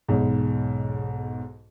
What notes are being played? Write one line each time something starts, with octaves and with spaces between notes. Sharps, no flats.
B1 E2 G#2